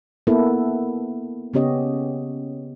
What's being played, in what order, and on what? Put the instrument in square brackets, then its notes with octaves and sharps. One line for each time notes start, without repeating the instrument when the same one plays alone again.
[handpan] A#3 B3 E4 A4 B4
C#3 B3 C#4 G4 C#5 D#5